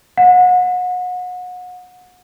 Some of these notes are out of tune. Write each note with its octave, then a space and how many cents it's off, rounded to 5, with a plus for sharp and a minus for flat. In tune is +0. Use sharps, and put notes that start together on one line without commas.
F#5 -30